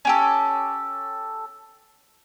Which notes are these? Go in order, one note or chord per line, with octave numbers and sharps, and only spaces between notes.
C#4 G4 A4